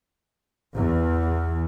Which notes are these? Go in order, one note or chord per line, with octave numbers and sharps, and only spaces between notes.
E2